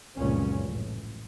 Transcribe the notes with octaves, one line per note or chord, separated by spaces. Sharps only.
F1 C#2 F#2 A#2 C#4
A1